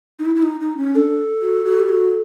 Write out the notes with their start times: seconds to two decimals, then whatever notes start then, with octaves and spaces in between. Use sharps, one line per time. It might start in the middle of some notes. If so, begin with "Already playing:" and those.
0.19 D#4
0.25 E4
0.35 E4
0.43 D#4
0.60 D#4
0.77 C#4
0.95 D4 A4
1.42 F#4
1.65 F#4
1.80 G4
1.89 F#4